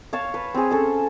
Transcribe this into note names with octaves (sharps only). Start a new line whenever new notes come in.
C#5 F5 A5
B4
C4 G#4
C#4 A4 A5